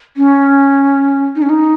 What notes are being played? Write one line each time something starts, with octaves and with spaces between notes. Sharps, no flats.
C#4
D#4
C#4
D#4